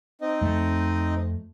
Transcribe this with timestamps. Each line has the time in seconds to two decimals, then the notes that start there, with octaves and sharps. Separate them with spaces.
0.21 C4 D#4 D#5
0.41 F2 A3